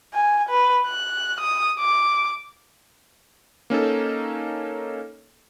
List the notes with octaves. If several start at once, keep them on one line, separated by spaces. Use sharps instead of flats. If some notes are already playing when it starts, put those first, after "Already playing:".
G#5
B4
F#6
D#6
D6
A#3 C#4 D#4 A4